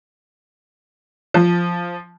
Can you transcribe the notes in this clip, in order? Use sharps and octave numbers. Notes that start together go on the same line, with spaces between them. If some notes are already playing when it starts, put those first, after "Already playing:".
F3